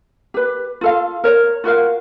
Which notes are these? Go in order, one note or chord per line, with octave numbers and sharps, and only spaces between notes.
G4 B4
F4 A4 F5
A#4 C#5
F4 F#4 A#4 F5